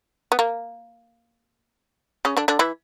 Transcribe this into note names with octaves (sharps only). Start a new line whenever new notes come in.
B3
A#3
C#3 C#4
D3 D4
D3 D4
E3 E4